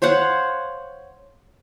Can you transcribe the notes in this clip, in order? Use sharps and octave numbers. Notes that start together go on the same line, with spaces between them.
C5 C#5 F5 F#5